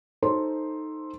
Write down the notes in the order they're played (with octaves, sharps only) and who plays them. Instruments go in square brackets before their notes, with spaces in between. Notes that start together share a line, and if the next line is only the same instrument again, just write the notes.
[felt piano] D#4 A4 C5 C6